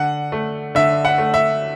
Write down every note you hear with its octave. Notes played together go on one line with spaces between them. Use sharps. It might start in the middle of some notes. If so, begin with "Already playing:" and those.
Already playing: D3 F#5
A3
D3 E5
F#5
A3
E5